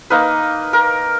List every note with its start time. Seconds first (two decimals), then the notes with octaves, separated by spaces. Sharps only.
0.10 A#3 D#4 B4
0.73 A#4